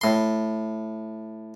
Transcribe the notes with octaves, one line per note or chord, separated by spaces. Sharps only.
A2 C6